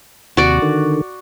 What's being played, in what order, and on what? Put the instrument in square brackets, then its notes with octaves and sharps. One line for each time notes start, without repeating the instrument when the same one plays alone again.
[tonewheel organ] D#2 C3 [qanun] F#4 D5
[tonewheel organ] D3 D#3